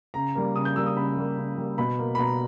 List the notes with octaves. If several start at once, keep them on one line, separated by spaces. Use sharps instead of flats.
C#3 A#5
G3 A#3
C#3 D#6
G6
G3 A#3 E6
D#6
C#3 B5
G3 A#3
C#3
G3 A#3
B2 B5
A#3
B5
B2 A#5